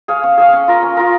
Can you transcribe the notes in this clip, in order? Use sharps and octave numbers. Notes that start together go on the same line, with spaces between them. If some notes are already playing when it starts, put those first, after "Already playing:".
G#4 C#5 F5
C#4
G#4 C#5 F5
C#4
F4 A#4
C#4
F4 A#4